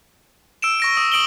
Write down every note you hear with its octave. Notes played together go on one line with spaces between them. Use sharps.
E6 D7 E7
C#6 A#6 D7
D#6
D#6 D7 F#7 G7